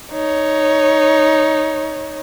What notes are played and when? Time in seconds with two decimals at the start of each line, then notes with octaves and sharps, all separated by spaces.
0.12 D#4 C#5